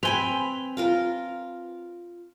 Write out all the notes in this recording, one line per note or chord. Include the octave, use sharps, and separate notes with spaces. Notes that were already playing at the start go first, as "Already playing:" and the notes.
C4 B4 G#5 B5 F7 G7
F4 A#4 F5